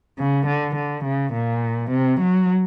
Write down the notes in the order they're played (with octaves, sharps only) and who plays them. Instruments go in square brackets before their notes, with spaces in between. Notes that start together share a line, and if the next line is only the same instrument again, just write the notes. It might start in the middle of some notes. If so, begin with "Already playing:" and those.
[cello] C#3
D3
D3
C#3
A#2
C3
F#3